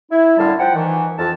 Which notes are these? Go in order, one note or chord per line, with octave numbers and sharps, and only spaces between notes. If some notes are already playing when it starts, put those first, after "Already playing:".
E4
F#2 A2 D3 G3 F5 A5
F3 F#5 G5
D#3 E3
F2 A5